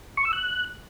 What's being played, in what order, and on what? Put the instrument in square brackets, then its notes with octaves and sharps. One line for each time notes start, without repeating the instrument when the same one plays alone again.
[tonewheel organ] C#6
E6
F#6